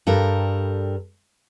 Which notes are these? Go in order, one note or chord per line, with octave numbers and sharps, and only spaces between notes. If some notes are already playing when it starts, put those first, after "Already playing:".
G2 G3 A4 A#4